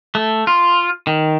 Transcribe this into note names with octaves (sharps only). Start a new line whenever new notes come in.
A3
F4
D#3